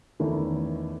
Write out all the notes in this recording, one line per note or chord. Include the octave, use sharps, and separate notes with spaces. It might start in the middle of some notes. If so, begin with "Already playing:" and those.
E2 D#3 A3 C#4 E4